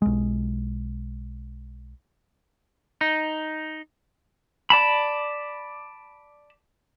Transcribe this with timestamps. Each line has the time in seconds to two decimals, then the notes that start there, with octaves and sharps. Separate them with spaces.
0.02 B1 G#3
3.01 D#4
4.70 D5 A5 B5